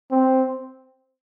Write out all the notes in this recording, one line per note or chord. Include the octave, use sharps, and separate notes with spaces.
C4